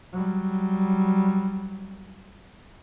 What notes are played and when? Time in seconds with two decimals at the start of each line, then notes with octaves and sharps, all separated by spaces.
0.13 F#3 G3